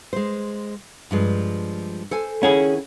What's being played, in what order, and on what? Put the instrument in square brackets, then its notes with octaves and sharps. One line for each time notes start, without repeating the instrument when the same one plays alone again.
[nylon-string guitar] G#3 C5
G2 F3 G#3
A4 C5 G#5
[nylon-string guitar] D#3 E4 F#5 [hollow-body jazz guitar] C#4 G#4